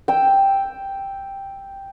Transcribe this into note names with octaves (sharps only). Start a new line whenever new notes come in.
G5 E6